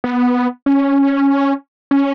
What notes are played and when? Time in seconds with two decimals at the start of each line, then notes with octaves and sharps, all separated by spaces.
0.04 B3
0.66 C#4
1.91 C#4